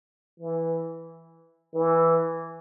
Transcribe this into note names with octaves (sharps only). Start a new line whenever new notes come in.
E3
E3